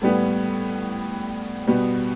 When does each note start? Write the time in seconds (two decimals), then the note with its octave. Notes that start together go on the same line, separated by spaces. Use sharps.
0.02 A2 G3 B3
1.67 B2 G3 B3